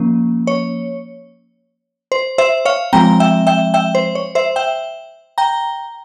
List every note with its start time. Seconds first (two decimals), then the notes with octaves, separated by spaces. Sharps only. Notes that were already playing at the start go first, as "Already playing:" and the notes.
Already playing: F3 A#3 C#4
0.47 C#5
2.12 C5
2.38 C5 E5
2.65 C#5 F5
2.93 F3 G#3 C4 G5 A#5
3.20 E5 G5
3.47 E5 G5
3.74 E5 G5
3.95 C5
4.15 C#5
4.35 C5 E5
4.56 E5 G5
5.38 G5 A#5